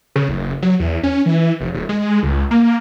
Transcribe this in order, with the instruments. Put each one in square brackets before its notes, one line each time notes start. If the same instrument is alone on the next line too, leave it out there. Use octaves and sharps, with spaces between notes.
[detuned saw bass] C#3
F#1
F#3
E2
C#4
E3
F1
D#1
G#3
C#2
A#3